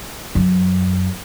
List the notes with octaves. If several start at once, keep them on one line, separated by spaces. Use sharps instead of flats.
F#2